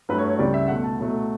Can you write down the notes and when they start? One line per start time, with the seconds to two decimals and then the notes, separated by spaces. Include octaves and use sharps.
0.09 G2 F#3 A3 B4
0.18 C#5
0.29 C#5
0.39 C#2 C#3 G3 D5
0.54 E5
0.68 B2 A3 F#5
0.84 A5
0.99 B2 F#3 A3